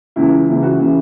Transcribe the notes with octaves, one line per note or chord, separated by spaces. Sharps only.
C#2 C#3 E3 E4
C#2 C#3 E3
F#4
C#3 E3